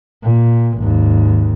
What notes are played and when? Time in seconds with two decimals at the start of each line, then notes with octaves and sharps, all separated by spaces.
0.23 A#2
0.78 G#1 D#2